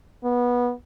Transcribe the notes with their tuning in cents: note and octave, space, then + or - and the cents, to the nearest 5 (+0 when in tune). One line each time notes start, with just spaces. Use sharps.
B3 -20